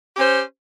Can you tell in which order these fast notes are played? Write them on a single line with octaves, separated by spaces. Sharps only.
G4 C#4 C5